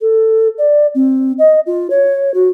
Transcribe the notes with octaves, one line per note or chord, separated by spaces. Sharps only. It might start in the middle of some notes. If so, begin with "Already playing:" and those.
A4
D5
C4
D#5
F4
C#5
F#4